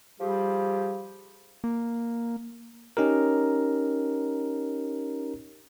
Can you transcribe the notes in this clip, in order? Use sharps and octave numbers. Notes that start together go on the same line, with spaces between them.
F3 G3 G4 G#4
A#3
C#4 D#4 G4 A#4